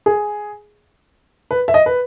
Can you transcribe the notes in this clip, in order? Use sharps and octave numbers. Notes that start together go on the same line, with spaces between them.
G#4
B4
E5
D#5
B4